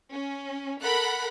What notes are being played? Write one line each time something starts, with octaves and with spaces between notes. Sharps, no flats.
C#4
A4 A#4 F#5 B5 F#6